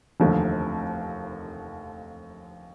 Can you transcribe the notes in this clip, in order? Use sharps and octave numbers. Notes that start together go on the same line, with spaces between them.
F1 D#2 D3 F3 A3